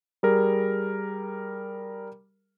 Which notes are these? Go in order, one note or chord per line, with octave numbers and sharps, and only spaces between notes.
G3 G#4 A#4